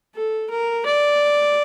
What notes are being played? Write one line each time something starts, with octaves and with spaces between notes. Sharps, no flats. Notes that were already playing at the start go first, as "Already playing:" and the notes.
A4
A#4
D5